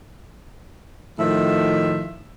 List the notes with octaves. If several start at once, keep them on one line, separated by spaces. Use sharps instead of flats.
A2 D#3 F3 E5